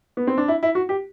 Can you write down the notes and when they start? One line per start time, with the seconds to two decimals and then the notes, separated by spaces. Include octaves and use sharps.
0.17 B3
0.27 C4
0.38 D4
0.48 E4
0.63 E4
0.75 F#4
0.89 G4